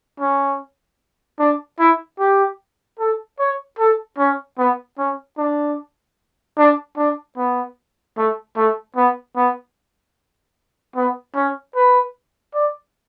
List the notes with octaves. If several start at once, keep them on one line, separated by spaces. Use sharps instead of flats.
C#4
D4
E4
G4
A4
C#5
A4
C#4
B3
C#4
D4
D4
D4
B3
A3
A3
B3
B3
B3
C#4
B4
D5